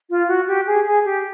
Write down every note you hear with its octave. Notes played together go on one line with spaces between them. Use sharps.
F4
F#4
G4
G#4
G#4
G4